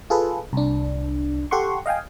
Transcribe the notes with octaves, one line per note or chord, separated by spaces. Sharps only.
F4 G#4 A4 B4
C2 D4
G4 A4 F#5 C6 C#6
D#5 F5 G5 G#5